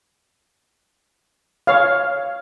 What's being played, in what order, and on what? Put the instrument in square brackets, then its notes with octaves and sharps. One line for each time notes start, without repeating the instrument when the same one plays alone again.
[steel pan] C#5 F5